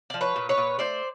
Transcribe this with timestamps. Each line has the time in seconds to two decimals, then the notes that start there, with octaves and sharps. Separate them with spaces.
0.10 F3 D5
0.21 B4 C#5
0.36 A#2
0.49 B4 C#5
0.57 A#2
0.79 A3 C5 D5